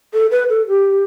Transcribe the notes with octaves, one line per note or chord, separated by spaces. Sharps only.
A4
B4
A4
G4